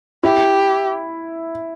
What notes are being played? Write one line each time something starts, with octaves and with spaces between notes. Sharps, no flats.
E4 G4